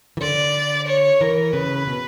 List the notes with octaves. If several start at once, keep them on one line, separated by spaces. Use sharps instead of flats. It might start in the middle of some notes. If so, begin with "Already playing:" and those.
E3
D3 D5
C#5
E3 A#4
C#3 B4
B2